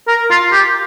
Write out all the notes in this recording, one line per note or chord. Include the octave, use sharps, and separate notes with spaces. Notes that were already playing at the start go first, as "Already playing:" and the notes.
A#4
F4
G4